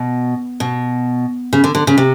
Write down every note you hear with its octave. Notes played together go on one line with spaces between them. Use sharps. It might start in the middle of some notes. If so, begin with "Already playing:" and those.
Already playing: B2
B2
C#3
D3
D3
C#3
C3